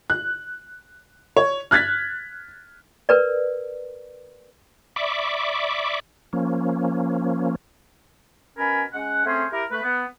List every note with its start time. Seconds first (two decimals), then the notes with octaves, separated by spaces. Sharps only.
0.10 F#6
1.36 C#5
1.71 F6 F#6 G#6 A6 B6
3.09 A#4 B4 D5
4.96 D5 E5 B5 C#6 D6
6.33 F3 A#3 C#4
8.58 B2 C#4 A#4 G#5 B5
8.93 G#3 C#4 F#5
9.25 A3 C4 C#4 G#4 C5
9.51 E4 G4 A#4
9.72 A3 B4
9.83 B3